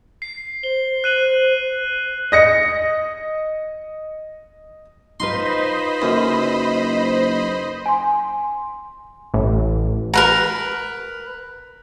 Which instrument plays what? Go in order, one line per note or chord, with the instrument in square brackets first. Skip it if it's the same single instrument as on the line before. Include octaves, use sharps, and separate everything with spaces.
[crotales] C7
[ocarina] C5 [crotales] G7
[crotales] F#6 D#7 F#7
[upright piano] D#5 A#6 C#7
[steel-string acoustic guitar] D#4 F4 B4 [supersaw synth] C5 D#5 B5 [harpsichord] C6
[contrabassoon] F#1 [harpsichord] F#2
[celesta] G#5 C6
[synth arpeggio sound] A1
[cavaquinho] A#4 B4 A#5